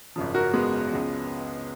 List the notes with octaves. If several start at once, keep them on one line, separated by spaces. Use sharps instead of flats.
G#1 F#2 C#3 F3
F#4 A#4
G#3 B3
C#2 C#3 F3